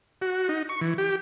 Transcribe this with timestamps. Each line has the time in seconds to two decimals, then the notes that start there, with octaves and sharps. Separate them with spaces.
0.22 F#4
0.49 D#4
0.69 C#6
0.81 E3
0.98 G4